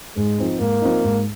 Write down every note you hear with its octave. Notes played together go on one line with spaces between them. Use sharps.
G#2 G#3
F3 C4 D#4
G#2 A#3
F3 C4 D#4
G#2